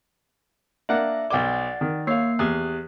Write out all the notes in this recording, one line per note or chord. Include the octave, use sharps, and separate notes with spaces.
A#3 D4 E5 F#5
B1 D5 F#5 D6 A6
D#3
A#3 C#5 F5 C7
E2 G4 D#6 F#6